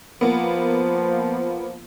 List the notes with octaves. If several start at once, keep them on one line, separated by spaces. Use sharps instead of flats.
F3 A#3 B3